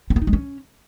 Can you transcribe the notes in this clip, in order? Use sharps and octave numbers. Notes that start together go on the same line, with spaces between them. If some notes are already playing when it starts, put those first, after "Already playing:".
C4
B3
D#4
G#3
C#4